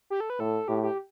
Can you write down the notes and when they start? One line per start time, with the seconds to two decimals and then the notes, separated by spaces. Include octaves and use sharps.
0.10 G4
0.20 A4
0.30 B4
0.39 A2 A4
0.68 A2 G4
0.83 G4